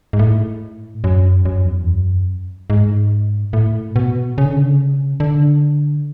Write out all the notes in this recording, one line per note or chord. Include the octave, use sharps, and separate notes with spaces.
G#2
A2
F#2
F#2
E2
F#2
G#2
A2
B2
C#3
D3
C#3
D3